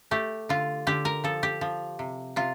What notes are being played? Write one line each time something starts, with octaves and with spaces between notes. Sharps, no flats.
A3 G4
D3 F4
D3 G4
A#4
F3 A4
G4
F3
C3
C3 F4